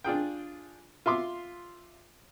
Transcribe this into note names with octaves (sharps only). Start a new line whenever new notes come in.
D4 F4 G#4 G5
F4 E5 C6 D6